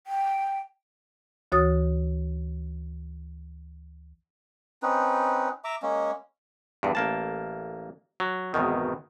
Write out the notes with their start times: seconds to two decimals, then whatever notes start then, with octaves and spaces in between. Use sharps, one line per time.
0.07 G5
1.52 D2 E3 F#4 C#5 D#6 A6
4.83 C4 C#4 D#4 B4
5.64 E5 A#5 D6
5.82 G#3 A#3 C#4
6.83 E2 G2
6.95 A1 A#3 A5
8.20 F#3
8.54 G#1 E2 B2 D#3